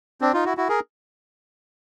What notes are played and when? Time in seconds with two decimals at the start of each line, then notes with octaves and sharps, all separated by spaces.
0.21 C4 D4
0.34 D#4 F4
0.45 E4 F#4
0.57 E4 F#4
0.69 G#4 A#4